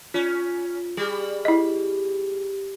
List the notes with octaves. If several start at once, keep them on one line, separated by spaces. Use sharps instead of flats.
C#4 F4
G3 G#4
E4 D#5